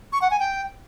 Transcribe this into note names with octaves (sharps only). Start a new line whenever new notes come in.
C#6
F#5
G#5
G5